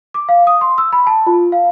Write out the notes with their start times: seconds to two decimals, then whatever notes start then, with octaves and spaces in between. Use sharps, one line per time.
0.14 D6
0.29 F5
0.47 D#6
0.61 C6
0.78 E6
0.93 B5
1.07 A5
1.27 F4
1.52 F5